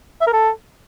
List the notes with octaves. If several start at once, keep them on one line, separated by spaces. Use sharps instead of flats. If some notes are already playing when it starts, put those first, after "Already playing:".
E5
A#4
A4